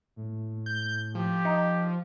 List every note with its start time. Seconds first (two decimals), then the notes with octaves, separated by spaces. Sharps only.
0.16 A2
0.66 G6
1.15 F3 G4
1.45 D#4